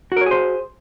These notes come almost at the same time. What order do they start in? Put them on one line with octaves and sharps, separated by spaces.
F#4 A#4 C#5 G#4 C5